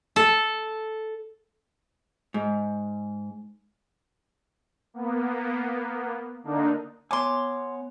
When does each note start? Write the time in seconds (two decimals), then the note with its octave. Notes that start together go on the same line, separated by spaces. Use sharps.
0.16 A4
2.34 G#2
4.94 A#3 B3
6.43 D3 A#3 D4 D#4
7.11 B3 C#5 G#5 C6 D6